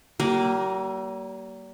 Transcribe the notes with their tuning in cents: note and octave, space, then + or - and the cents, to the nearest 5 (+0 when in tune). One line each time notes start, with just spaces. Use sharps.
G3 -45 A#3 +0